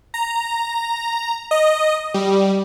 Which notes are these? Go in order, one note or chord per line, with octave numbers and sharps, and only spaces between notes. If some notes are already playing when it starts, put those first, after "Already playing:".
A#5
D#5
G3